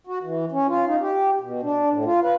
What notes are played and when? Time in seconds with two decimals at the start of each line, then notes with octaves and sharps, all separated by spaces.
0.07 F#4
0.23 E3
0.52 C#4
0.67 F4
0.86 D#4
1.00 G4
1.41 B2
1.62 D4
1.90 A2
2.05 F4
2.22 B4